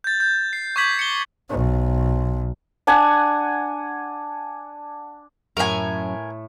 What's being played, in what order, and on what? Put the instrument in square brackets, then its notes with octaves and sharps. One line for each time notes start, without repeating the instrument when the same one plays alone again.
[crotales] G6 A6
G6
C7
C#6 D6 G6 G#6 B6 F#7
C#7 G7
[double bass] B1
[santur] D4 F#5 G#5
[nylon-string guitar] F#2 [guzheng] A2 A3 [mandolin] A#4 G#5